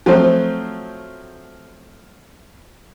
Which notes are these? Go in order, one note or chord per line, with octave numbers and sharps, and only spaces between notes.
F3 F#3 A3 C4 C5